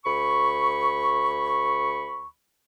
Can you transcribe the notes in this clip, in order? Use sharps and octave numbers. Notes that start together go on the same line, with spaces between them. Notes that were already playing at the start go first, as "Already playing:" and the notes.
D2 B5 C#6